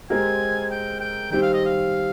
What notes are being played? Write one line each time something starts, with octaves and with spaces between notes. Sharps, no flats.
G#3 C4 G4 A#4 G#5
G5
G5
D#3 G3 C4 G5
F5
D#5
F5